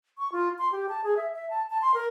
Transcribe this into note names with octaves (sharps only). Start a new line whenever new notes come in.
C#6
F4
C6
G4
A5
G#4
E5
E5
A5
A5
C6
A#4